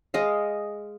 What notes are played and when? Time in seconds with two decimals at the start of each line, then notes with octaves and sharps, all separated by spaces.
0.14 G#3 D#5 F5